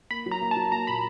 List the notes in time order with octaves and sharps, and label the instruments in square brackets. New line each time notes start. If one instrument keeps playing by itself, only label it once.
[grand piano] A#3 [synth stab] B5
[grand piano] F#3
[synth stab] A#5
[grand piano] A#3
[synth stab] A5
[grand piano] F#3
[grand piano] A#3 [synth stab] A#5
[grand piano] A#2 [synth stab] B5